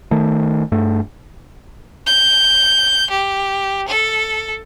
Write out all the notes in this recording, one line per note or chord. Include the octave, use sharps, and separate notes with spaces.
D#3 A3
G2 A3
G6
G4
A4